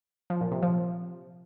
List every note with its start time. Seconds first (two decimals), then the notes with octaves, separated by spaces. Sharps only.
0.30 F3
0.41 A#2
0.52 C3
0.63 F3